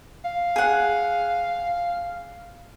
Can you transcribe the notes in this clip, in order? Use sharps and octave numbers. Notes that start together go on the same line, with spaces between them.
F5
G#4 F#5